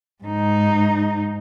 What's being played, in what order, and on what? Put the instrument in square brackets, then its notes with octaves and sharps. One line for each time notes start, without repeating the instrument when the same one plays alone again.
[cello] G#2 D#4